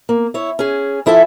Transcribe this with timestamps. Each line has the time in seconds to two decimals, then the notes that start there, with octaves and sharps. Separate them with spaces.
0.09 A#3
0.34 E4 C#5
0.59 C#4 G#4
1.06 F3 E4 A4 E5 G#5